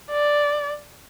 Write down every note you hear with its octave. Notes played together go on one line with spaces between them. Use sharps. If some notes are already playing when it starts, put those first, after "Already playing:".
D5